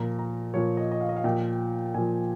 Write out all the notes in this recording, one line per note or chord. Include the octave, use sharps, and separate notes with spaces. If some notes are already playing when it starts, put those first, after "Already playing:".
Already playing: A#2 F3 A#5
A#5
A#2 F3 C#5
D#5
D#5
F5
D#5
F5
A#2 F3 G5
A#2 F3 G#5